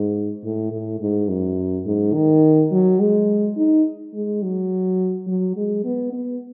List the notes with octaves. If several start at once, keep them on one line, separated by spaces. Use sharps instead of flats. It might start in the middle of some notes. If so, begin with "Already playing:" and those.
Already playing: G#2
A2
A2
G#2
F#2
G#2
D#3
F#3
G#3
D#4
G#3
F#3
F#3
G#3
B3
B3